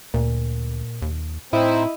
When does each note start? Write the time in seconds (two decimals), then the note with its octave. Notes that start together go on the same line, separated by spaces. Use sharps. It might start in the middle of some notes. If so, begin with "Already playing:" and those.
0.14 D2 A#2
1.02 D#2
1.53 A2 C4 D#4 E4 C5 D#5